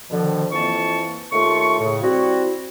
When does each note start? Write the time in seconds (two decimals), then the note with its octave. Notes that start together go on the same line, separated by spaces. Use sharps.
0.10 B2 D3 D#3 F3
0.52 F2 E3 A#3 A5 C#6
1.31 D#2 A3 F4 C#6
1.80 A2 C#3
2.01 G3 C4 E4 F#4